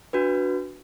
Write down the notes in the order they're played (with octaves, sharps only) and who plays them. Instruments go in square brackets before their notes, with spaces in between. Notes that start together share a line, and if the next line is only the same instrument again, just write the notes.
[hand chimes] D4 F#4 B4